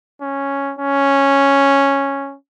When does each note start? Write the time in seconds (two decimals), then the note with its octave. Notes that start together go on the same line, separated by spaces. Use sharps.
0.21 C#4
0.79 C#4